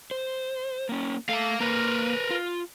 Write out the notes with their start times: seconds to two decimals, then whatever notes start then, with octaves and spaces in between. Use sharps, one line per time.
0.11 C5
0.89 A#3 C#4
1.29 A3 F5 A#5
1.61 A#3 A#4 B4
2.30 F4